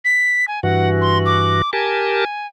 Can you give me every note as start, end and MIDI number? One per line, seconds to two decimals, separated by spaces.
0.05 0.45 95
0.48 0.62 80
0.63 1.62 43
0.63 1.62 52
0.63 1.62 66
0.63 0.89 78
1.01 1.18 84
1.26 1.70 86
1.73 2.25 67
1.73 2.25 70
1.73 2.47 80
1.73 2.25 81